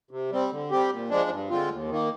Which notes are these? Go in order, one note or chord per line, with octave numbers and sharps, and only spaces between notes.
C3
G3 C4
D3
G3 C4 G4
A#2
F3 G#3 D4
G2
D3 G#3 C4 F4
D#2
D#3 A#3